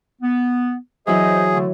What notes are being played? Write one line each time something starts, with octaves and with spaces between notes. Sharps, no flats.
B3
E3 F#3 E4 G#4 C5 D#5
D3 A3